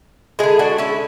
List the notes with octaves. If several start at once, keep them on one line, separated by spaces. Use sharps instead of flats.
D3 G#3 E4 G#4
D4 F#4
C#4 E4